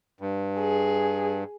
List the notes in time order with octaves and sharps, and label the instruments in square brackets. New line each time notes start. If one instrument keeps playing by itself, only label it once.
[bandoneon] G2
[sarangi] G#4